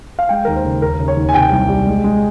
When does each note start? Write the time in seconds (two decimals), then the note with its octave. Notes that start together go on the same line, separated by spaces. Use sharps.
0.19 F5
0.29 G#3 G5
0.45 D#2 A#4
0.56 C5
0.65 C#3
0.82 D#2 A#4
1.00 C#3
1.08 C#5
1.17 D#2
1.29 G#5
1.34 C3 G5
1.52 C2
1.69 G3
1.87 G#3
2.04 G#3